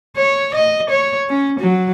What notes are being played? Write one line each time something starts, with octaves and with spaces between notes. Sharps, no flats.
C#5
D#5
C#5
C#4
F#3